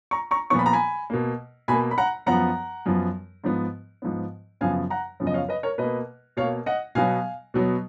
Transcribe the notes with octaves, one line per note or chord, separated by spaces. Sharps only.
A#5 C#6
A#5 C#6
A#2 F3 B3 C#6
B5
A#5
G#5 B5
B2 A#3
B2 A#3 G#5 B5
B5
F#5 A#5
F#2 F3 B3 F#5 A#5
F#2 F3 B3
G#2 F3 B3
G#2 F3 B3
F#2 C#3 F3 B3 F5 G#5
F#5 A#5
F#2 C#3 F3 B3
D#5
C#5 F5
B4 D#5
A#4 C#5
B2 A#3 B4 D#5
B2 C#5 F5
A#3
D#5 F#5
B2 F#3 B3 F5 G#5
B2 F#3 B3